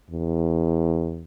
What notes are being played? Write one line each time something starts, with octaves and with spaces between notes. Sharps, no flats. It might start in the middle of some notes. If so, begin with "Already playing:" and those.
E2